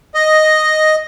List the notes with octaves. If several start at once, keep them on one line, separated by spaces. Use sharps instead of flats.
D#5